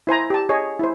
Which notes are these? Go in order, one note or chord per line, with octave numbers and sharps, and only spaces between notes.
E4 C5 G#5 A#5
G4 A5
G#4 C#5 D#5
E4 C5